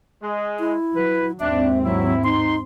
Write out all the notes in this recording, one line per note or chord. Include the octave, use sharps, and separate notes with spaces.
G#3
E4
F#3 B4
D#2 G#2 C4 D4 E5
F#3 E4
D#4 C6